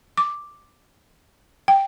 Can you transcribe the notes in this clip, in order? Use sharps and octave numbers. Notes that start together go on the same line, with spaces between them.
D6
G5